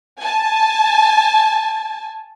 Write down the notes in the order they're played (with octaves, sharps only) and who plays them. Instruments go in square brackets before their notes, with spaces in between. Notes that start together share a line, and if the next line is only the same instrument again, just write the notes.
[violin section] G#5 A5